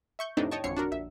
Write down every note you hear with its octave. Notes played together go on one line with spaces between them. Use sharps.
E5 C#6 G6
F2 A2 C3 E3 D4 D#4
C#5 D#5 G5 A5 C#6
G#1 F2 D3 C#5 C7 C#7
D4 F#4 A#4
A#1 E5